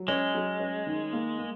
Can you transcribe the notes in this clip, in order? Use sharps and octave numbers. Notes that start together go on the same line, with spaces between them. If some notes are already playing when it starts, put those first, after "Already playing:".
Already playing: F#3
G#3 C#4
F#3
C#4
D#3
A#3
A#3